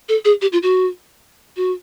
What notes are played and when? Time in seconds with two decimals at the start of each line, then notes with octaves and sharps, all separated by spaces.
0.08 A4
0.25 G#4
0.41 G4
0.52 F4
0.62 F#4
1.56 F#4